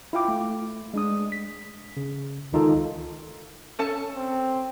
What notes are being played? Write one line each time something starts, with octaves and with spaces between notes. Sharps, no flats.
E4 F4 F5 G5 D6
A3
G#3 D4 D#6
B6
C#3
C#2 D#3 D#4 F4 A4
C#4 A4 A5
C4